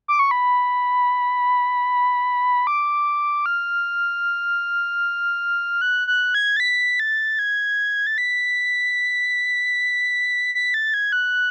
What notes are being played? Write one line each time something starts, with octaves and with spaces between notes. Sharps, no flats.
D6
C#6
B5
D6
F6
F#6
F#6
G#6
A6
B6
A6
G#6
A6
B6
B6
A6
G#6
F#6